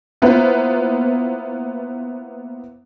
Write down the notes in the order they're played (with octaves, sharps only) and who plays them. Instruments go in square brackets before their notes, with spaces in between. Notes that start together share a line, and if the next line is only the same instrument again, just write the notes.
[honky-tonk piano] A#3 B3 E4 F4 B4 C5